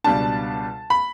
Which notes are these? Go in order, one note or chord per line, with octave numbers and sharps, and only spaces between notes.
C#2 B2 G3 D4 A5
B5